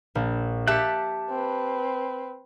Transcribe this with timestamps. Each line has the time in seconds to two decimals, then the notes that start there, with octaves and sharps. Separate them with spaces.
0.15 A#1
0.68 G4 E5 A5 F#6 B6 C#7
1.30 C4 B4